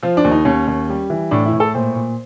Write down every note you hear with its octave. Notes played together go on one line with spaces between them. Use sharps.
F3 F4
D4
D#2
D#4
D#2 C#4
D#2
G3
E3
A2 D4
E4
A2
A4
A#2 C5
A#2